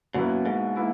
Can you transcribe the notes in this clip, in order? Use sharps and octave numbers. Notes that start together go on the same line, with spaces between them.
F#2 B2 A#3 E4 B4
G#2
E3 A#3 E4